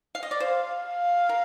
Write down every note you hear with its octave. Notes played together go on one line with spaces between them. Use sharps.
F5
D#5
D5
C5 F5
F5
A#4